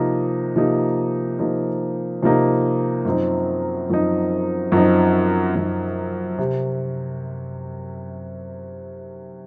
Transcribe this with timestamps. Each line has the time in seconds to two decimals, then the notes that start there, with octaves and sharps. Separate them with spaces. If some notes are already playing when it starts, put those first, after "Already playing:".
Already playing: C3 F3 A#3 D#4
0.56 C3 F3 A#3 D#4
1.39 C3 F3 A#3 D#4
2.23 C3 F3 A#3 D#4
3.05 F#2 F3 C4 D#4
3.89 F#2 F3 C4 D#4
4.72 F#2 F3 C4 D#4
5.55 F#2 F3 C4 D#4
6.39 C3